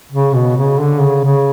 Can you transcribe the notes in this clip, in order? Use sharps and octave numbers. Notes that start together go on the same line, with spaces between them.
C#3
B2
C#3
D3
C#3
C#3